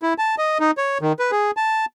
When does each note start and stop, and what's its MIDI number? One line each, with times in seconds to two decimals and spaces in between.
0.02 0.14 64
0.18 0.35 81
0.38 0.58 75
0.60 0.71 63
0.78 0.98 73
1.01 1.13 51
1.19 1.31 71
1.31 1.51 68
1.57 1.85 81